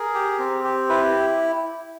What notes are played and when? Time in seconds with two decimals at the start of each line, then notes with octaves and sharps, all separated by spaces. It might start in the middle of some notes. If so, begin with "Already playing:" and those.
Already playing: G#4 A#4
0.14 G4
0.39 C4
0.64 G4
0.89 E4 B4